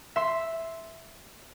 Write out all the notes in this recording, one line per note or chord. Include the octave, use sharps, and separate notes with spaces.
E5 C6 C7